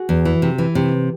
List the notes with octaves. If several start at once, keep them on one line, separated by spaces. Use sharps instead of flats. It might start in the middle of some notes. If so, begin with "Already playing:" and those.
Already playing: F#4 G#4
E2
E3
C3
E3
C3